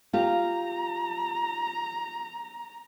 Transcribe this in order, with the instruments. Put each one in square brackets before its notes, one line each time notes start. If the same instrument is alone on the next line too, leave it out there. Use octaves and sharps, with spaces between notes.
[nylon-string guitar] F4 G4 [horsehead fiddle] A#5